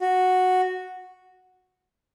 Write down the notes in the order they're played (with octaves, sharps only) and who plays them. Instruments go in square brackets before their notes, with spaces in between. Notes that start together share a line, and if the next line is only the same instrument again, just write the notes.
[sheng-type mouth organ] F#4